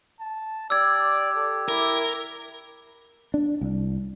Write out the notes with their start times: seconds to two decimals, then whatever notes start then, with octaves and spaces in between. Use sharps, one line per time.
0.20 A5
0.70 G4 D5 E6 G#6
1.36 A4
1.69 E4 A#4
3.34 D4
3.61 C2